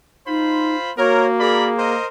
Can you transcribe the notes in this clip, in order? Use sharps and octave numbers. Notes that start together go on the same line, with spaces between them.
D#4 F4 C5 B5
A#3 F#4 A#4 C#5
G#4 A#4 D5 B5
A#4 C5 D#5